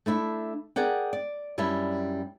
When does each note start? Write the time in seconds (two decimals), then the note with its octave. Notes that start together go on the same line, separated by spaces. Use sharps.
0.06 A3 D4 E4 E5
0.76 G#4 A#4 D5 F#5 G5
1.13 D5
1.58 F#2 G3 C#4 D4 E4